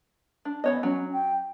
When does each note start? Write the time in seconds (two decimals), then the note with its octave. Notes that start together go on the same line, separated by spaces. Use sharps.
0.45 D4
0.64 E3 B3 C#5 D#5
0.83 F#3 C#4
1.12 G5